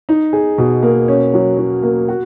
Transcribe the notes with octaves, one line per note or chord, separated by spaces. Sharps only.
D#4
G#4
B2
A#3
C#4
F#3
F#3
A#3
F#4